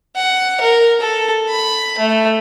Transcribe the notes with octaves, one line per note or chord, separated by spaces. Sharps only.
F#5
A#4
A4
B5
A3